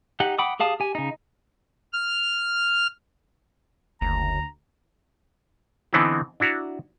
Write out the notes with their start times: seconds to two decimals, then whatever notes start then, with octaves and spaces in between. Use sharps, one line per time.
0.20 D#4 G4 F#5
0.38 F#5 G5 B5 D6 D#6
0.60 G4 G#4 F5 A5 D#6
0.80 G4 G#5
0.95 C#3 D#4
1.93 F6
4.01 F#1 D2 A#5
5.93 D3 E3 B3 C4 D#4 E4
6.40 D4 E4 F#4 A#5